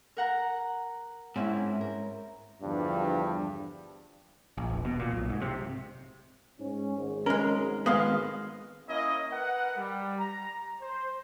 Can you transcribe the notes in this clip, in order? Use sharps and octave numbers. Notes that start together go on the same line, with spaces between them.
A#4 F#5 A#5
G#2 C4 C#4 E4
A#4
E2 G2 D3 F3 G3 D4
A#1
E1
B2
A#2
B1
G#2
C3
G#2 C#4
G#1 G#2
G#3 C#4 A#4
D#3 G#3 B3 D#5 F5
A#3 C#4 E4 D#5
A#4 B4 F#5
G3
A#5
C5